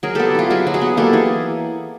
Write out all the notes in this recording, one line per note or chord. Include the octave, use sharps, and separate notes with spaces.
F#3 G#4 A#4
B3 G4 A4
E4 F4 G4
F#3 F#4 G#4
F#3
F#4 G#4
B3
A#3 G4 A4
E3 G#4